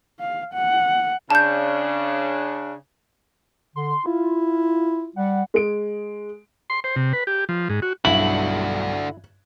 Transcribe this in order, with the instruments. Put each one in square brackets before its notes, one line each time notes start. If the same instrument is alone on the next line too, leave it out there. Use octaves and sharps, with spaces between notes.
[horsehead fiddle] F5
F#5
[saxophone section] C#3 D4 [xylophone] A5 G6
[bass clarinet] D3 [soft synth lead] C6
[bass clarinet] E4 [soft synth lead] F4
[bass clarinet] G3 [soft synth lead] F#5
[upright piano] G#3 D7
[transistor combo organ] C6
C5
C3
B4
G4
F3
G#2
F#4
[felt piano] B1 G2 [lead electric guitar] D3 F#4 [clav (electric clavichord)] E4 [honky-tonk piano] F#7